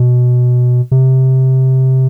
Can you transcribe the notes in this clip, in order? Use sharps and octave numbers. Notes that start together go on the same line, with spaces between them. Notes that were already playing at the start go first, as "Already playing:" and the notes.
Already playing: B2
C3